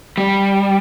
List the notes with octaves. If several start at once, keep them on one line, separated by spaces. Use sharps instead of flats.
G3